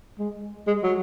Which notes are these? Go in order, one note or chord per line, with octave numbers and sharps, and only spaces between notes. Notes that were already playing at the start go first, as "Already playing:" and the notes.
G#3
G#3
F#3